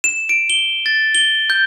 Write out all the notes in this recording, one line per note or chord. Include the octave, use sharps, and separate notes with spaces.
E7
D7
G7
A6
G7
G6